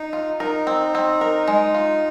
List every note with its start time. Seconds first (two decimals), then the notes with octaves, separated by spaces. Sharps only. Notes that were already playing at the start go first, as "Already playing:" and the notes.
Already playing: D#4
0.13 F4
0.40 D#4 A#4
0.67 C4
0.95 C4
1.21 A#4
1.48 G#3
1.74 F4